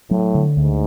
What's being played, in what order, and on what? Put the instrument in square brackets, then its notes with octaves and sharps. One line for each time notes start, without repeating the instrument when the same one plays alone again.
[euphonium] A2 [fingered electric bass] F#3
[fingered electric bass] D3
[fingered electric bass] D2 [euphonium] G#2